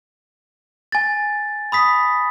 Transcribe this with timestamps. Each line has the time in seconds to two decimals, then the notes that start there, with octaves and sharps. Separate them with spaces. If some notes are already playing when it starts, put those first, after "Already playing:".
0.92 G#5 A6
1.72 B5 D#6 B6